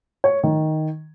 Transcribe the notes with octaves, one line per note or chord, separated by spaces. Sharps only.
C#5
D#3